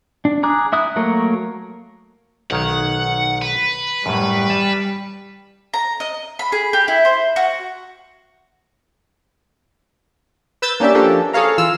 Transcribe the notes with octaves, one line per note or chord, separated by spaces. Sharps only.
D4
G#4 A#5 D6 F#6
E4 E5 D#6 F#6
F#3 A3 A#3 A#4 C#5
B1 D#3 C#5 F#5
B4
F#2 A2 G3
A5
A#5
D#5
B5
G#4
G4
E4
C5
F#4
B4 E6 G6 A6
A#3 C#4 D4 G4 D5 E5
F3 A#3 C#4 D4 G4 A4
G#4 A4 C#5 F5 A#5
E3 F4 E6 F6